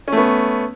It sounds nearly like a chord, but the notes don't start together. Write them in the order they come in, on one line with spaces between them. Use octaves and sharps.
C#4 A3 B3